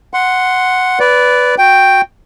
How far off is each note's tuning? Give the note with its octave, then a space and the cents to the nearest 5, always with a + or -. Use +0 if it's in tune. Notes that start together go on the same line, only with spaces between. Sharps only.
F#5 +0 C6 +0
B4 +5 D5 -15
F#4 -15 G5 +0